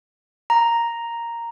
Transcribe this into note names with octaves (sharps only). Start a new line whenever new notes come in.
A#5